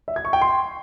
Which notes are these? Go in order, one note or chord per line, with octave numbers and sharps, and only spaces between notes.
E5
G#6
C#6
G5
C6